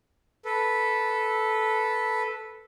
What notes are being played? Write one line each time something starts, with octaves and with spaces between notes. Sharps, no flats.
A4 B4